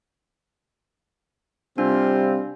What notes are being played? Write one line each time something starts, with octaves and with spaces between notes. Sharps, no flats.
C3 G3 C4 D4 F4